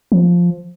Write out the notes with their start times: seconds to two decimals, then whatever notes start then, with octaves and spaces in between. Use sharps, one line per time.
0.12 F3